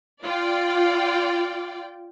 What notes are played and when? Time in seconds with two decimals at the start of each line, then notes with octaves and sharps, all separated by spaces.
0.23 F4 D5 G5